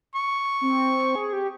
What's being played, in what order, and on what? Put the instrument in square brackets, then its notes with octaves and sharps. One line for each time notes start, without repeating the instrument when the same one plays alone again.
[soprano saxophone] C#6
[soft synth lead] C4
G#4
G4